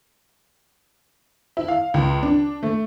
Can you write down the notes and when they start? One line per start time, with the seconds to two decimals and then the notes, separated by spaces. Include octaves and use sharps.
1.57 E4
1.68 F5
1.94 C#2
2.23 D4
2.63 A3